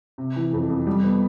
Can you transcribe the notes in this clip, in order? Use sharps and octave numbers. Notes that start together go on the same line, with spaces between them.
C3
E3
F2
F2
G3
B3